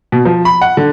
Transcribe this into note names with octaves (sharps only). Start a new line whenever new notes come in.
B2
F3
B5
F#5
D3